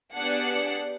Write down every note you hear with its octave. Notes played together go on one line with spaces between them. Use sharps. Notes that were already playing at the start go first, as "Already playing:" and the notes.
B3 D4 G4 G#4 F#5 A5